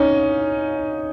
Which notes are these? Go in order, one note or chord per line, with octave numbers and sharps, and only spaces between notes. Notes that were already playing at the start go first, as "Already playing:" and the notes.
Already playing: C#4 D#4